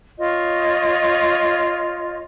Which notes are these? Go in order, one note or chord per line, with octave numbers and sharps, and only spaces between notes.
F4 C#5 D#5